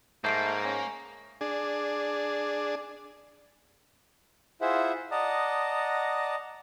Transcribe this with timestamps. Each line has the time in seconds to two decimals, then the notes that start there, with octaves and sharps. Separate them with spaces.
0.24 G#2 A3 A#3 G6 C7 D7
0.65 C#4
1.41 D4 G#4
4.61 E4 F4 G#4 C5 E5 F#5
5.11 D5 D#5 F#5 A5 A#5 D#6